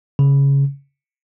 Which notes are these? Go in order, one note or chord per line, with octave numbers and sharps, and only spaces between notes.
C#3